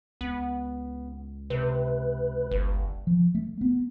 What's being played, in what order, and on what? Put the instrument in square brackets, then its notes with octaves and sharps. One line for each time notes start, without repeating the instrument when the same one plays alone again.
[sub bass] C#2 [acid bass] B3
[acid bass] C3 [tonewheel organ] B4
[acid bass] G1
[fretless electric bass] F3
A3
B3